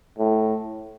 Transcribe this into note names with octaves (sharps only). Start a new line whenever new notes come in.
A2